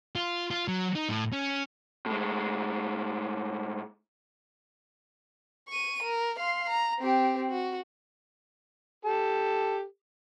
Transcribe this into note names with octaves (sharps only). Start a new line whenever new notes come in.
F4
F4
F#3
D#4
A2
C#4
A2 G#3
C#6 D#7
A#4
F5 C6
A#5
C4 G4
F#4
G4 A4